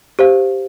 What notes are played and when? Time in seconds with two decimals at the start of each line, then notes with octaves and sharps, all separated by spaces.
0.19 G4 C5 F5